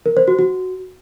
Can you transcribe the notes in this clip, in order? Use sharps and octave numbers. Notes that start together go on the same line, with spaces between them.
A#4
C5
F#4
F#4